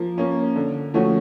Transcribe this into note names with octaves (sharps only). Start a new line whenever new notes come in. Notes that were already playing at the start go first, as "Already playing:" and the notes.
Already playing: F3 A#3
A#3 C#4
D3
F3 A3 C#4 F#4